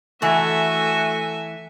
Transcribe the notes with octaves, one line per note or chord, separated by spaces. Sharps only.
E3 A3 F#4 A4 E5 G#5